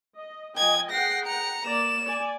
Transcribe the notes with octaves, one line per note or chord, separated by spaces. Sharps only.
D#5
F3 D#5 G5 G#5 G#6
G#4 F#5 G5 A#6 C7
A#5 C#7
A#3 D5 E7
D5 G#5